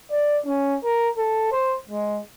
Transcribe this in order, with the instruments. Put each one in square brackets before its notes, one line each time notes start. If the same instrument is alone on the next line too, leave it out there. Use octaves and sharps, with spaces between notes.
[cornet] D5
C#4
A#4
A4
C5
G#3